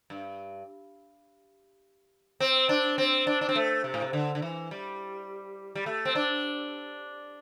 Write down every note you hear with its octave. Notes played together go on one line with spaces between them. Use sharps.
G2
C4
D4
C4
D4
D4
C4
A3
C3
A2
C3
D3
D3
E3
G3
G3
A3
C4
D4